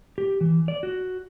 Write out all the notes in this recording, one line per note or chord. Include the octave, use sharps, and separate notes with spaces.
G4
E3
D5
F#4